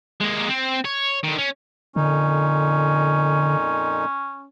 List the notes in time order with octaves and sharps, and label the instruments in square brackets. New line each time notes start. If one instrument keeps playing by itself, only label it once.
[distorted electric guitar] G#3 A#3
C4
C#5
D3 D#3
C#4
[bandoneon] F2 A#2 D#4 [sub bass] D3 [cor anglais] C#4